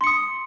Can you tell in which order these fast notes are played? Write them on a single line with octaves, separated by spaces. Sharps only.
C6 C#7 D#6